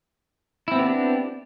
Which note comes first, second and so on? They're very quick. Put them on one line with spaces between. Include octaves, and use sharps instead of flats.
E4 C4 B3 G4 D4